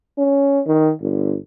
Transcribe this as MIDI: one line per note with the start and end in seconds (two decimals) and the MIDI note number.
0.18 0.60 61
0.66 0.92 51
1.01 1.37 31